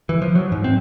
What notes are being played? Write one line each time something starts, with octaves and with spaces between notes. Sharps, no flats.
E3
F3
F#3
G#2
C4